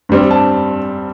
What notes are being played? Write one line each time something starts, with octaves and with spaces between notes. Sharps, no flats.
G2 G3 C4
A5